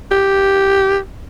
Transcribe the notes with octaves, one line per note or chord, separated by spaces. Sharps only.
G4